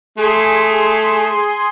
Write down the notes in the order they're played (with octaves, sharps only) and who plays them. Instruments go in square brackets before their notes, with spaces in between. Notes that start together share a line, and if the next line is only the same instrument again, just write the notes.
[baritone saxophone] A3 [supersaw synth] G#4 G#5 C6